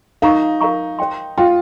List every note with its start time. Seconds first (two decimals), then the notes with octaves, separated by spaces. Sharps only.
0.22 D#4 A#4 F5 A#5 C#6
0.61 A#4 F5 A#5 C#6
0.99 C5 G5 C6
1.38 F4 C5 G5 C6